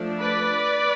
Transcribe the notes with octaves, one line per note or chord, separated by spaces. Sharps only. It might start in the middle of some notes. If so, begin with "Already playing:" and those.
Already playing: F3 A3 D4
B4 D5